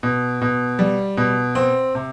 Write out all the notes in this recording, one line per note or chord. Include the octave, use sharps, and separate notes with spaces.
B2
B2
G3
B2
C4
C3